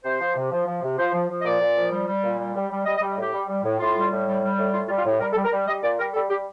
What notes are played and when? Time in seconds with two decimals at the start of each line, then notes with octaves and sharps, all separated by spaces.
0.04 C3 C5
0.20 F3
0.35 C3
0.51 F3
0.67 F3
0.82 C3
0.98 F3 C5
1.14 F3
1.29 F3
1.41 D#5
1.45 A#2 D5
1.60 A#2
1.76 F3
1.92 G3
2.07 G3
2.23 A#2
2.39 G3
2.54 G3
2.70 G3
2.86 G3 D#5
2.97 D#5
3.01 G3
3.09 D#5
3.17 A2 G4
3.33 G3
3.48 G3
3.64 A2
3.80 A2 F4
3.96 G3
4.11 A2
4.27 G3
4.42 G3
4.58 A2
4.74 A2 F4
4.85 F4
4.89 G3
4.97 F4
5.05 A2 G4
5.20 G3 A#4
5.32 A4
5.36 G3
5.44 A#4
5.51 G3
5.67 G3 D#5
5.83 A#2 D5
5.99 G3 A#4
6.14 G3 A4
6.30 G3 G4